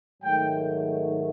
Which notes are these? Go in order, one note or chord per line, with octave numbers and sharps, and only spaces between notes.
G#2 D#3 F#3 A3 G5